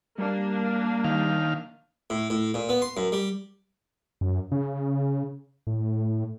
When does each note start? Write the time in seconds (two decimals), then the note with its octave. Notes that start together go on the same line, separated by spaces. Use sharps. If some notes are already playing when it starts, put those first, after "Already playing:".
0.18 G3 A#3 D4
1.04 D#3 F5
2.10 A2
2.30 A2
2.54 A#2
2.69 B3
2.82 C6
2.97 F#2
3.12 G3
4.21 F#2
4.52 C#3
5.67 A2